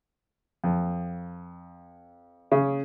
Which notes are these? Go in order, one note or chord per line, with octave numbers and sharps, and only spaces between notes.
F2
C#3